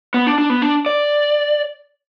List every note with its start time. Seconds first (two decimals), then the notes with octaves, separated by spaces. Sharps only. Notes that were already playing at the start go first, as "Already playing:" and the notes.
0.14 B3
0.27 D4
0.38 D4
0.50 B3
0.62 D4
0.86 D5